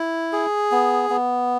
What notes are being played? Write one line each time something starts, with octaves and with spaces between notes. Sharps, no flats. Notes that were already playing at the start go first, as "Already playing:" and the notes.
Already playing: E4
G#4
B3
B3